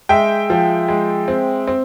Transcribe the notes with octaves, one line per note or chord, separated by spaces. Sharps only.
G#3 E5 G5
F3
G#3
C4
C4